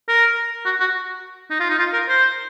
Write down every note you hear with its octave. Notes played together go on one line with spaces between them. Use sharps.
A#4
F#4
F#4
D#4
F4
D#4
F4
A#4
C5